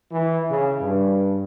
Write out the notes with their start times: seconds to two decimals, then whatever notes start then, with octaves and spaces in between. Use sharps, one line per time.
0.11 E3
0.50 C#3
0.81 G2